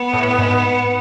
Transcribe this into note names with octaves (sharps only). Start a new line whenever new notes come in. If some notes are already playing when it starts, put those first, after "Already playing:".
Already playing: B3
A2
G#2